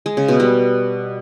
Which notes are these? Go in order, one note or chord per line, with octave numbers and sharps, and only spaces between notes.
G#3
C#3
B2
G3